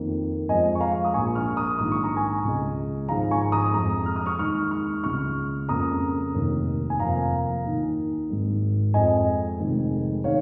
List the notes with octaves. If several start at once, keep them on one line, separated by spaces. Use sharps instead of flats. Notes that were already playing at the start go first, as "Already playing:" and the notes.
Already playing: F2 D#3 A#3
F2 F3 G#3 D#5 G#5
C#6
F5 A#5
D#6
A#1 A#2 F3 G#5 C#6
C#6 F6
A#5 D#6
A#1 G#2 D#3 D#6
C#6
A#5
G#5 C#6
C#2 C#3 G#3
G#1 G#2 F3 G#3 F5 A#5
G#5 C#6
A#5 D#6
F2 F3 G#3 A#5 D#6
F6
D#6
C#6 F6
D#2 D#3 G#3 C#6 F6
C#6 F6
C#2 C#3 G#3 C#6 F6
F2 C#3 A#3 A#5 D#6
F1 D#2 D#3 A#3
G#5
F1 F2 F3 A#3 F5 A#5
D#2 D#3 A#3
G#1 G#2 G#3
F2 F3 G#3 D#5 G#5
F1 F2 D#3 G#3
D#3 G#3 C#5 F5